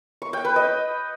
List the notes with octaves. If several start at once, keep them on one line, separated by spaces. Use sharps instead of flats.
C#6
G5
B4
D#5